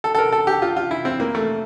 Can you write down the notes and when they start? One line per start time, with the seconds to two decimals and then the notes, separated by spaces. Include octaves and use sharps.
0.04 A4
0.15 A4
0.18 A#4
0.32 A4
0.47 G4
0.62 F4
0.76 F4
0.91 E4
1.05 C4
1.20 A#3
1.35 A3